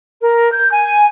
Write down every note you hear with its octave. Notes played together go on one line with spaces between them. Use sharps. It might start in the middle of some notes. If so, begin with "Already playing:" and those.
A#4
G6
G#5